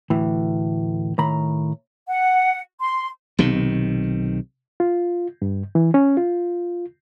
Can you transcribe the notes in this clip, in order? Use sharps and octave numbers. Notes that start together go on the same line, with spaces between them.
D2 A2 E3
A2 D#3 A#5 B5
F#5
C6
B1 C3 D#3
F4
G2
E3
C#4
F4